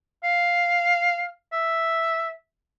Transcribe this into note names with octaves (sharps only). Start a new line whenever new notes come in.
F5
E5